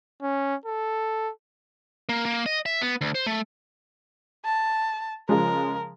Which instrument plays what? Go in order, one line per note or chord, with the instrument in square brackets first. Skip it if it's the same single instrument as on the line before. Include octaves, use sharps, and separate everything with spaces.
[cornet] C#4
A4
[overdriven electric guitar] A#3
A#3
D#5
E5
B3
D2
C5
A3
[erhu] A5
[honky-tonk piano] C#3 F3 G#3 [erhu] A#4